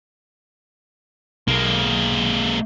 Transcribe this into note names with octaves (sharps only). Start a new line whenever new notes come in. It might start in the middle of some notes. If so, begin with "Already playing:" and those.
B1 G#3 A#3